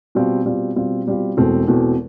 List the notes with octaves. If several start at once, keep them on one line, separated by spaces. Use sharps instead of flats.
B2 G3 C4 F4
B2 G3 C4 F4
B2 G3 C4 F4
B2 G3 C4 F4
E1 E2 B2 A3 C4
E1 E2 B2 A3 C4